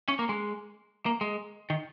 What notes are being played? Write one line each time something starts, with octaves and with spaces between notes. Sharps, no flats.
C#4
A#3
G#3
A#3
G#3
D#3